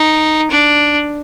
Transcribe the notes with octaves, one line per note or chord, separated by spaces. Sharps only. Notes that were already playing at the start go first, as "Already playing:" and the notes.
Already playing: D#4
D4